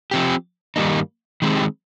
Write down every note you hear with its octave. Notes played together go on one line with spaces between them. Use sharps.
F3 C4 G4
G2 D#3 G3 A#3 D#4
D#3 G#3 C4 G4